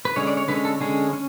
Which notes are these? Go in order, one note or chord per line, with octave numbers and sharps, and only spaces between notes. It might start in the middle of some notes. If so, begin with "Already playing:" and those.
B4
D3 G#3 C#4 C#5
D5
C#5
D3 G#3 C#4 B4
A4
D3 G#3 C#4 G#4
C#4